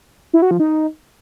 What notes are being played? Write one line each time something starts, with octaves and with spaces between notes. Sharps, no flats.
E4
F#4
F3
D#4